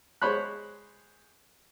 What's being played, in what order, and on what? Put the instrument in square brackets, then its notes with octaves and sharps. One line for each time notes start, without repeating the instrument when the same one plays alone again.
[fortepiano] G#3 C5 C#5 B5 F#6